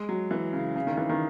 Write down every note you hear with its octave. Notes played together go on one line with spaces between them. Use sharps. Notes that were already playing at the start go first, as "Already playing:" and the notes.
Already playing: G#3
F#3
E3
C#3
C#3
D#3
E3
D#3